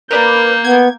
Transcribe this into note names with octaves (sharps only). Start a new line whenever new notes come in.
A#3 A#4 B4 D5 G6
B3 G#6